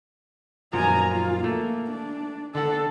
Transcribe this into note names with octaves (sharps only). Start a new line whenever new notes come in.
F#2 A#2 F3 G#5 A#5
F4
A3 A#3
D4
D3 A4 F#5